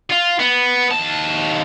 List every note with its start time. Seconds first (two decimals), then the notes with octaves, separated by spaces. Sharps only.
0.10 F4
0.39 B3
0.91 D#2 A5